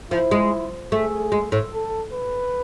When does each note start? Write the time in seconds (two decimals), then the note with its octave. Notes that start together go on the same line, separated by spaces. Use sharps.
0.11 F3 E4
0.31 G#3
0.92 A3 G#4
1.32 G#3
1.52 A2
1.73 A4
2.13 B4